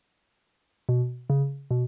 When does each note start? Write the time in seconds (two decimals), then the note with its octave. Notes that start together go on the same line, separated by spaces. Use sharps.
0.89 B2
1.30 C#3
1.71 B2